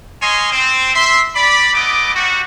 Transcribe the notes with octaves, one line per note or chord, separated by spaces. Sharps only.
C#5 D#5 F5 G#5 C6
C4
E5 C6
D5 B5
A3 B3 D#5 D6
G3 F#4